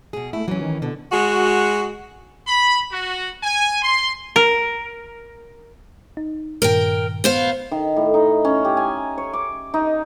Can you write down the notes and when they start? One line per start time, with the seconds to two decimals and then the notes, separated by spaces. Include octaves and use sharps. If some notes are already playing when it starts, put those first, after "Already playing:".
0.13 B2 G#4
0.33 A3 E4
0.48 E3 F#3 C#4
0.61 D#3
0.82 B2 D3
1.12 G#3 F#4
2.48 B5
2.91 F#4
3.43 G#5
3.82 C6
4.36 A#4
6.17 D#4
6.62 G2 A#2 D#3 A#4 G5
7.24 B3 C5 F5
7.71 D#3
7.96 A2
8.14 D#4
8.45 C#4
8.65 G4
8.77 G#5
9.18 C#5
9.33 D6
9.74 D#4